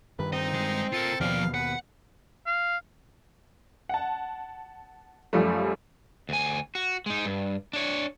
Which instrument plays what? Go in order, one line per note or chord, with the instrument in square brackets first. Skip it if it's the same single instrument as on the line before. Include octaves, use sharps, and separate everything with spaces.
[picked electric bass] G2 D#3 [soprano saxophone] B4
[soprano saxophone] C4 [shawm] D#4 [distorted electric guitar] D#5
[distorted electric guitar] G#3
[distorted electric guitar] F4 A#4 [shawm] A4
[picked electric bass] D#2 B2 [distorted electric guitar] F3 D5 [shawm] F5
[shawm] B4 [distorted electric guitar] F#5
[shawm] F5
[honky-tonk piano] F#5 A5
F#2 F3 G3 A3
[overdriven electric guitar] D2 G#5
F#4
G#3 D#4
G2
D4 C#5